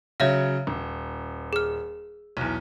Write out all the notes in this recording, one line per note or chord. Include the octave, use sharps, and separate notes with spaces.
C#3 F#3 C#5 E5 F5
D#1
G#4 F6
B1 E2